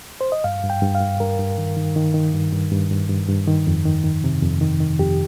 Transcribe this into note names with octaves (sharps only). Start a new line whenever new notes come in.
C5
D#5
G2 F5
G2
G5
G2
F5
G2
G2 A#4
G2
D#3
D#3
D#3
D#3
G2
G2
G2
G2
G2
G2
D#3
F2
D#3
D#3
C3
F2
D#3
D#3
F2 G4